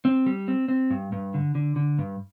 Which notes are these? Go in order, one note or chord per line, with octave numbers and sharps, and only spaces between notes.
C4
G3
C4
C4
G2
G2
D3
D3
D3
G2